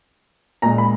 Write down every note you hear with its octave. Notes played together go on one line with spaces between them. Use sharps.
A#2 G#3 A#5
B5